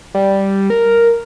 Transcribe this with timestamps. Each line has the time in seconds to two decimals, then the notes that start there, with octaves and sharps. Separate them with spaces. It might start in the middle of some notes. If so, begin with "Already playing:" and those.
0.14 G3
0.70 A#4